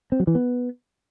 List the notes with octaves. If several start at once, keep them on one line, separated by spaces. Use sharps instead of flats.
C4
F#3
E3
B3